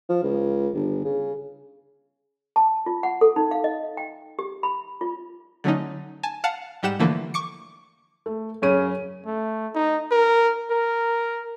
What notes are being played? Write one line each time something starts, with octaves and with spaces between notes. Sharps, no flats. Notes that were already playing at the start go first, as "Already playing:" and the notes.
F3
C#2
G1
C#3
A5
F4
F#5
A4
D#4
F5
D#5
G5
G4
B5
F4
D3 F#3 A3 C#4 D#4
G#5 A5
F5 F#5 A5 C#7
G#2 G3 G4 F#5 E7
D3 E3 F3 A3 A#3
C#6 D6 C#7
A3
F#2 C#3 C#4 D#7
A3
D#4
A#4
A#4